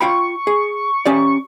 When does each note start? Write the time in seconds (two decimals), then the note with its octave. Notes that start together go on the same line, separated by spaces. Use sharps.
0.01 F4 G5 B5 C#6
0.47 G#4
1.05 C#4 G4 D5